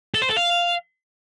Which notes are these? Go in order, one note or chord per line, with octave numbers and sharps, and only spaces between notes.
A4
C5
A4
F5